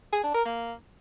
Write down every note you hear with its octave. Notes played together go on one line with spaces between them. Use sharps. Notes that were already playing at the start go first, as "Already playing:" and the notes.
G#4
D4
A#4
A#3